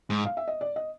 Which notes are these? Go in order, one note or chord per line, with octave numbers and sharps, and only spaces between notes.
G#2
F5
E5
D#5
D5
D#5